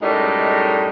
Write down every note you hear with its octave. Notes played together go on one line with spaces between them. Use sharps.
F#2 A2 G3 G#3 D#4